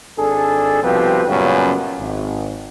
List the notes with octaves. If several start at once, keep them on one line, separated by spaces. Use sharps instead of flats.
G#1 D4 G#4 A4
C2 B2 F3 C4 G4 B4
F#2 A#2 C#3 G3 B3 C#4
G#1